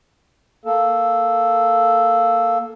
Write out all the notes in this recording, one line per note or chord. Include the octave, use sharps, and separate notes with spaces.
A#3 A4